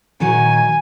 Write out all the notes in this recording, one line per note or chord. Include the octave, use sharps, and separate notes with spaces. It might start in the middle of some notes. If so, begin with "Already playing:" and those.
A#2 D#3 F#3 G#5